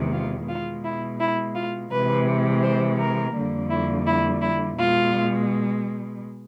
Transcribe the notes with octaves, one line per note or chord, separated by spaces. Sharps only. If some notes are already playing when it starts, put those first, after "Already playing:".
Already playing: E2 C3 D#3 G#3
F4
B2 G#3 F4
E4
E4
F4
C3 E3 G#3 B4
C5
A#4
F2 D3 G3 A#3
E4
E4
E4
B2 G#3 F4